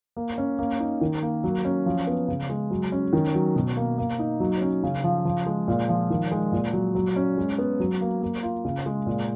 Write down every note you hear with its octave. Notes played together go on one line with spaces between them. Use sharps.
A#3
C#4
A#3
D#4
D#3
A#3
F#3
C#4
F3
B3
C#3
G#3
F#3
C#4
D#3
F#3
B2
A#3
A#3
D#4
F#3
C#4
C#3
F3
F3
G#3
A#2
F3
D#3
G#3
A#2
F#3
F#3
C#4
G#3
B3
F#3
A#3
A#3
F4
C#3
G#3
A#2